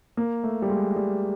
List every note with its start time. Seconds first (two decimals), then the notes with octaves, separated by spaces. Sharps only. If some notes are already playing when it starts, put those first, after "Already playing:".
0.17 A#3
0.44 A3
0.62 G3
0.70 G#3
0.96 G3